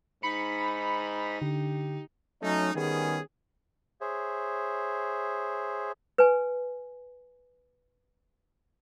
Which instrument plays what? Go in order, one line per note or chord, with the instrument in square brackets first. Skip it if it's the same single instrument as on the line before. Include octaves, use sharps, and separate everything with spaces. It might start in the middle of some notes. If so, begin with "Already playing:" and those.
[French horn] G#2 [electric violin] D#4 [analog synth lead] B5 [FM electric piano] C#7
[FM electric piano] D3 [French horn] G4
[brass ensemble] F#3 A3 C#4 D#4
D#3 G3 B3 C#4 G#4
[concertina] G#4 C5 C#5 E5
[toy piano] B4 G#5